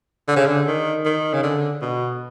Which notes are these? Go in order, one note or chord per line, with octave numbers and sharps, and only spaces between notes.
D3
C#3
D3
D#3
D#3
C#3
D3
B2